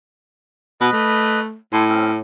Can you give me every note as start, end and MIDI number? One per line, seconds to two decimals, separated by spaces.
0.81 0.91 47
0.81 1.40 71
0.81 1.40 75
0.93 1.56 57
1.72 2.21 45
1.72 1.84 69
1.72 1.84 80
1.72 1.84 84
1.89 2.11 60
1.89 2.11 61